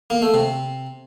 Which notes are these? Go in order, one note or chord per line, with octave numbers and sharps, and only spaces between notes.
A#3
A3
C3